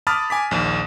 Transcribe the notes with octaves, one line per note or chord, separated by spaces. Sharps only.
A5 B5 D6 D#6 F6 A6
G#5 D6 B6
A#1 D#2